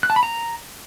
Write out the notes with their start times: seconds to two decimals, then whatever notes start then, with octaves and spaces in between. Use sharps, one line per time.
0.03 F#6
0.10 A5
0.16 B5
0.23 A#5